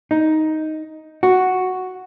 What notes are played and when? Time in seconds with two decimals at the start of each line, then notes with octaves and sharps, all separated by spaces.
0.11 D#4
1.23 F#4